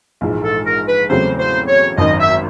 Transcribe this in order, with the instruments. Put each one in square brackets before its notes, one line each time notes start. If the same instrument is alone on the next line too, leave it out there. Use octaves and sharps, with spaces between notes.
[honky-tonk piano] A#1 G#2 E3 G#3
[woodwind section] A4
A#4
B4
[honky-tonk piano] E2 C#3 F#3 A3 C4 [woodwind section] C5
[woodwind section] C5
C#5
[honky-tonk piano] G#1 F#2 D#3 [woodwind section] D#5
[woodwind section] E5